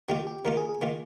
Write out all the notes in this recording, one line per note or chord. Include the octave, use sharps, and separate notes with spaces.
D#3 A#3 F4 G4
G4
D#3 A#3 F4 A#4
G#4
G#4
D#3 A#3 F4